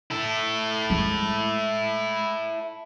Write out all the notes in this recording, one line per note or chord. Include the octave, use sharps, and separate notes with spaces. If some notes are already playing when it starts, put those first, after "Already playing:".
E4 A4
G#3